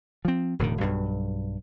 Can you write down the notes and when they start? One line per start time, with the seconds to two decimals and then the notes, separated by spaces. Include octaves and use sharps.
0.25 F3 C4
0.59 E1 A2 D3 D#3
0.80 B1 G2 F#3